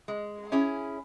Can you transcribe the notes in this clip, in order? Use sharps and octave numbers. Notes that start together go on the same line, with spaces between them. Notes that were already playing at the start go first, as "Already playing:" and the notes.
G#3
C#4 E4 G#4